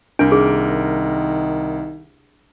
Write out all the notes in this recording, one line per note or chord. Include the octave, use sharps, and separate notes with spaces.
C2 D4 A#4 D7
D#3 G#4